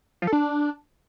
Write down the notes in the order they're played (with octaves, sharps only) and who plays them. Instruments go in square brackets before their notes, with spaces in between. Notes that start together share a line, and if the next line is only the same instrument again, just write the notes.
[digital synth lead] F3
A4
D4